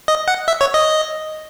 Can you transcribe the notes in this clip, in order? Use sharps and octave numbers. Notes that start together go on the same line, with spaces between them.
D#5
F#5
E5
C#5
D#5